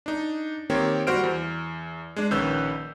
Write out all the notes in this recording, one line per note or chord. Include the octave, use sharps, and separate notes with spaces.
D4 D#4
D#3 A#3 C4 G4 C#5
G3 F#4 C5 F6 D7
E2
G#3 D4
A#1 D#3 C#4 B4 E6 G6